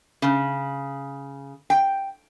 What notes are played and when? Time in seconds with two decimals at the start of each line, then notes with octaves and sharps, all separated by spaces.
0.22 C#3
1.70 G5